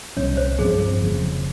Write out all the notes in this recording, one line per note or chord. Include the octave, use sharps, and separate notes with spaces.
C2 A#2 G3 C#4 C#5
C5
G2 F3 C4 G#4
F1 D#2 C#3 F3